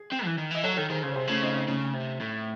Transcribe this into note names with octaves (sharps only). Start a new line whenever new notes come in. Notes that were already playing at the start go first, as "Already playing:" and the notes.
Already playing: G#4
C4
E3
D#3
E3 D#5
F#3 A4 C#5
D#3 A4 C#5
D#3 G#4 C5
C#3 G#4 C5
C#5
C3 G#4 C5
C#3 A3 C#4
C4 D#4
C4 D#4
C#3 A3 C#4
C3
A2